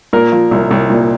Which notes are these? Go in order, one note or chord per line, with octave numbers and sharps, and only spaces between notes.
A#2 A#4
F3
C2
C2
A#2